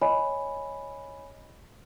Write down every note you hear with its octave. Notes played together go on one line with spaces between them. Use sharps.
C#5 D#5 G#5 B5